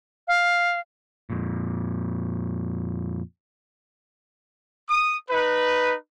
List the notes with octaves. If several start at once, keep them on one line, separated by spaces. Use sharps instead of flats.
F5
F2 A#2
D#6
D#4 B4